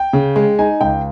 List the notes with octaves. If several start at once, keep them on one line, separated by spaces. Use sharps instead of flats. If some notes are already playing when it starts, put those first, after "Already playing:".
Already playing: G5
C#3
G#3
D#4 G#5
C#2 G5